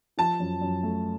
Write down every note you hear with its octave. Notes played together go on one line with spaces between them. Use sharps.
F3 A5
F#2
F#2
A3